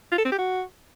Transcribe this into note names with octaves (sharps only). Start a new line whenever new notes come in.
F4
A4
C4
G4
F#4